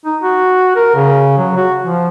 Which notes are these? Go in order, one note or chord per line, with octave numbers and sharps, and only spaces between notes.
D#4
F#4
A#4
C#3
F#3
F#4
F3